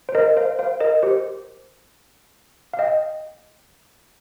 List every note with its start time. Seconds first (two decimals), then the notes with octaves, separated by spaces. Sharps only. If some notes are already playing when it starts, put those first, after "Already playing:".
0.09 C5
0.15 A#4 D#5
0.37 C5 F5
0.59 C5 F5
0.80 A#4 D#5
1.02 G4 C5
2.73 F5
2.79 D#5 G5